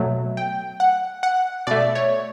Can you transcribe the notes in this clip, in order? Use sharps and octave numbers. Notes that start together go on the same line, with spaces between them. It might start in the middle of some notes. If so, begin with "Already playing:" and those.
Already playing: B2 F#3 A3
G5
F#5
F#5
B2 A3 D5
C#5